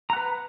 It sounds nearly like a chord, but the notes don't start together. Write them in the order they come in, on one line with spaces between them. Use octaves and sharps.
A#5 F#5 B4